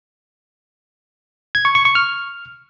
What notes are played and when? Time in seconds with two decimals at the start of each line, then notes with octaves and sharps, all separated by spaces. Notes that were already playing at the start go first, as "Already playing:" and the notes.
1.55 G#6
1.65 C#6
1.75 C#6
1.85 C#6
1.95 F6